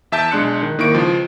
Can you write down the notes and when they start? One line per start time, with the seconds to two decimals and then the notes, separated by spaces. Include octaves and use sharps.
0.12 E2 E5 A5 G6 D7
0.31 B1 G#3 D4 C6 F#6 C#7
0.62 D#3
0.78 G#1 D#3 A#3 E4 C#6 D7
0.94 C#2 F3